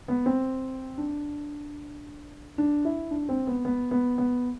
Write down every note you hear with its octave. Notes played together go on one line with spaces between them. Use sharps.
B3
C4
D4
D4
E4
D4
C4
B3
B3
B3
B3